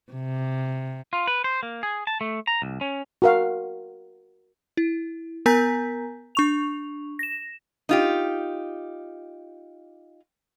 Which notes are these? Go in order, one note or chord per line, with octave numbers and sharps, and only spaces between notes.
C3
F4
B4
C5
A#3
G#4
A5
A3
A#5
C2
C#4
F#4 A#4 F5
E4
B3 A#4 G#5 A#5 G6 B6
D4 C#6 F7
A#6 E7
D#4 F4 G4